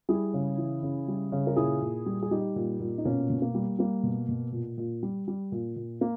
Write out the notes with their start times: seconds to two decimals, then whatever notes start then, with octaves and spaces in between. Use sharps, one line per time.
0.09 G3 E4 G#4
0.34 C#3
0.58 E3
0.83 C#3
1.08 G3
1.32 C#3
1.47 A#4
1.56 A#2 E4 G#4
1.81 A#2
2.06 G3
2.23 G#4
2.31 G3 D#4 G4
2.56 A#2
2.80 A#2
2.98 D#4
3.05 B2 A#3 C#4
3.30 B2
3.42 A#3
3.54 G3
3.79 G3 A#3
4.04 B2
4.29 B2
4.53 A#2
4.78 A#2
5.03 G3
5.28 G3
5.52 A#2
5.76 A#2
6.01 A#3